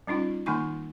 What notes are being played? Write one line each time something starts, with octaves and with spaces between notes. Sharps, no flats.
G3 C#4 D#4 F4
D#3 A#3 D#4 G#5 C#6